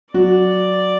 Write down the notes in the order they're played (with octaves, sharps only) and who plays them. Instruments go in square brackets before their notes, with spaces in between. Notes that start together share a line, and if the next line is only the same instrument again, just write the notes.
[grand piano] F#3 F#4 [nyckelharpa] D5